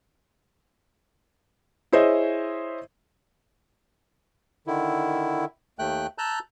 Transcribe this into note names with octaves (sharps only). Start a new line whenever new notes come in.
E4 G#4 C5 C#5 D#5 E5
D3 D#3 E4
D#2 A3 G5 F#6
A5 A#5 E6 F#6 G6